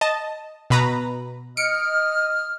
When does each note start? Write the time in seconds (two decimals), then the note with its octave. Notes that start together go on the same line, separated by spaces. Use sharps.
0.01 D#5 A5
0.70 B2 B4 A#5
1.57 D#5 D#6 F6 C#7 D7